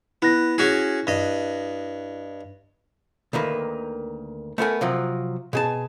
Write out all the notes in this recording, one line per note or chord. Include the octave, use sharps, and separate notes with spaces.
B3 E4 F#6 A#6
C#4 F#4 G#4
G2 D#5
D2 D#3 A#3 B4
A3 B3 A#4 G#5
C3 F3 F#3
B2 G#4 A5